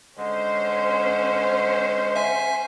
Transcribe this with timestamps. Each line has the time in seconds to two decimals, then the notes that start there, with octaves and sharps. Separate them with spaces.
0.17 D3 G#3 C#4 C5
2.16 E5 G#5